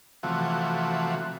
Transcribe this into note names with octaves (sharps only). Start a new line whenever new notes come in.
C3 E3 F3 A3 F#4